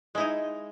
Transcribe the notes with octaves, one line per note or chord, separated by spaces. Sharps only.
G#3 D#4 E4